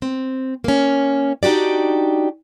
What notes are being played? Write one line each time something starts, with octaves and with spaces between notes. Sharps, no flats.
C4
A#3 C#4
D4 D#4 F#4 G4 D5